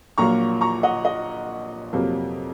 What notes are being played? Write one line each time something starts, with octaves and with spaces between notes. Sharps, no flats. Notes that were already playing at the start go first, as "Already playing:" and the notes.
A#1 A#2 F#3 A#3 A#5 C#6
A#5 C#6
D#5 F#5
D#5
F2 C3 F#3 A#3